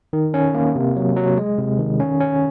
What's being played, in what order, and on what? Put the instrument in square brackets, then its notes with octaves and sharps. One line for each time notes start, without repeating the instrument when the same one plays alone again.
[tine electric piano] D#3
C#4
A#3
C3
F#3
F#3
G#3
C3
D#3
C#4
C#4